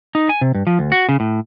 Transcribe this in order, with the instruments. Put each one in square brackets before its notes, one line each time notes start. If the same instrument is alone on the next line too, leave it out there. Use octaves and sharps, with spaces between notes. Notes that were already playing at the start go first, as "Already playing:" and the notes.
[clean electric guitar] D#4
G#5
C3
G2
F3
D2
F#4
C#3
A2